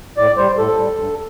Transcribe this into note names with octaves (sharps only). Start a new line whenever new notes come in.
A2 D5
G3 C5
A2 A4
G3
G2